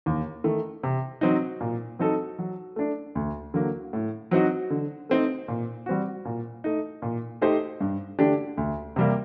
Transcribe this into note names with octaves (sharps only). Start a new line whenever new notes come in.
D#2
D#3 A3
C3
F#3 C4 D#4
A#2
F#3 C4 D#4 A4
F#3
A3 D4
D2
D3 F#3 A#3
A2
F#3 C4 D#4 F#4
D3
A3 C4 D#4
A#2
G3 C4 F#4
A#2
A3 D#4
A#2
A3 D#4 G4 C5
G2
D3 A3 D4 G4
D2
C3 G3 A#3